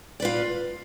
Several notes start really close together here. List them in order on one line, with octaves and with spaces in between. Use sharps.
D5 B4 F4